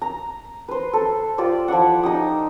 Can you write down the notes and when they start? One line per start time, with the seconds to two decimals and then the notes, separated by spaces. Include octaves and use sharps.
0.02 A#5
0.68 B4 C5
0.93 A4 C5
1.38 F4 G4 C5 D5
1.68 F3 E4 E5 F#5
2.03 D#4 G4 D#6